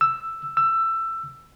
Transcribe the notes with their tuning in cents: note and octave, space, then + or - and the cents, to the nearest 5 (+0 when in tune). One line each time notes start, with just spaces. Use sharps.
E6 +10
E6 +20